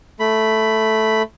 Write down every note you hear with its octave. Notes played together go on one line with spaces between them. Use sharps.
A3 B5